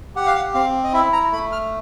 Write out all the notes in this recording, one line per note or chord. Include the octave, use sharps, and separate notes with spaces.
G4 F#5
F5
F#5
C4 F5
D#5
E4 E5
A#5
A3 B5
F6